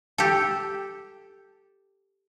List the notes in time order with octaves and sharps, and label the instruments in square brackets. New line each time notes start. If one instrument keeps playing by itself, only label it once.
[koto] G4 A4